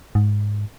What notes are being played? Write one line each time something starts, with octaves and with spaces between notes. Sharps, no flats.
G#2